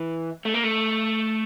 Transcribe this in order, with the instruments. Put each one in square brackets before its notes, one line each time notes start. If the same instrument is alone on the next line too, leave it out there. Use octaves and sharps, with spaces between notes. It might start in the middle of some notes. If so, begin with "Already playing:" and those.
Already playing: [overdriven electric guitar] E3
A3
A#3
A3